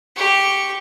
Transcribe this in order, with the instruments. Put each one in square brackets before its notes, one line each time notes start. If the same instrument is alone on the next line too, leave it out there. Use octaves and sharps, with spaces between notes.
[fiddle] G4 C#6